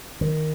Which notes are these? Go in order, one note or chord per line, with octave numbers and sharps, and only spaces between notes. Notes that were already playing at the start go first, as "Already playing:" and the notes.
D#3